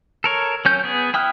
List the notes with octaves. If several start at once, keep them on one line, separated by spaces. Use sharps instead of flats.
A4 A#4 C#5
F#3 C#4 G6
B3 G#4
E4 G5 D#6 F6 F#6